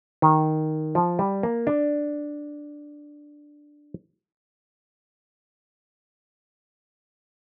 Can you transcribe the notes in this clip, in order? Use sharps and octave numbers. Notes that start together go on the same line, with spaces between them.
D#3
F3
G3
A#3
D4